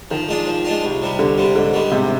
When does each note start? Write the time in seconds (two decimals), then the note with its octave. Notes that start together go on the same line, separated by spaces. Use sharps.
0.11 D#3 F3
0.28 G#3 D4 F4
0.46 F3
0.65 G#3 D4 F4
0.84 C2
1.02 C3 G3
1.19 C2 D3
1.38 C3 G3
1.55 G#2 D3
1.74 D#3 G3
1.91 G#2 C3